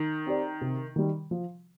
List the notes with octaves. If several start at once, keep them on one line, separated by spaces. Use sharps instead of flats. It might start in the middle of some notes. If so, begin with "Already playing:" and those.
Already playing: D#3
C4 G4 D5
C3
D#3 G3
F3